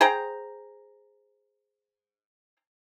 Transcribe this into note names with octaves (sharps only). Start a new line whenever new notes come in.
G#4 C5 G5 A#5